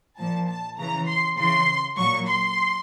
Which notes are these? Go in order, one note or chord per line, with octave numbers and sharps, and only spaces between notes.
A#2 F3 A5
A5
C#3 E3 A#5
C6
C#3 E3 C6
A#2 F#3 C#6
C6